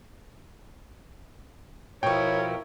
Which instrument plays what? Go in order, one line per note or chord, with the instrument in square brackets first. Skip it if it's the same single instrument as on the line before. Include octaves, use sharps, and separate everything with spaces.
[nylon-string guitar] B2 F3 [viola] E4 A#4 [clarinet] C#5 [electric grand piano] G5 C#6